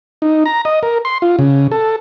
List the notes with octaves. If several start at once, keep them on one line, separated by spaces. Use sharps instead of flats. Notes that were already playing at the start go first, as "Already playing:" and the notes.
D#4
A#5
D#5
A#4
C6
F4
C#3
A4